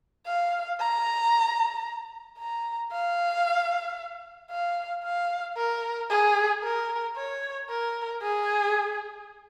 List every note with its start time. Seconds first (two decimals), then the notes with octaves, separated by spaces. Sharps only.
0.26 F5
0.80 A#5
2.39 A#5
2.92 F5
4.51 F5
5.04 F5
5.57 A#4
6.10 G#4
6.63 A#4
7.16 C#5
7.69 A#4
8.22 G#4